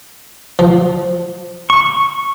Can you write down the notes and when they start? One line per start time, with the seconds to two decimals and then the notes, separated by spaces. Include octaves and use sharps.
0.59 F3
1.70 C#6